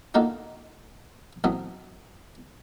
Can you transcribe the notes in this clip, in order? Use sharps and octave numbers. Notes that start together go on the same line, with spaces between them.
D3 D#3 A#3 D#4 F4 F#4
A1 F#3 C4 D#6